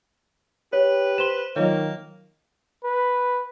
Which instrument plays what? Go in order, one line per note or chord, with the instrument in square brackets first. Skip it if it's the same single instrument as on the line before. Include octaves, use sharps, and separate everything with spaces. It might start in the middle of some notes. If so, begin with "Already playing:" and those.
[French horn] G4 [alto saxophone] B4 [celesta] C#5
[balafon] C5 C6 [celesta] E7 G7
[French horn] D#3 [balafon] F#3 F4 C#5 [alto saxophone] A#3
[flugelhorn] B4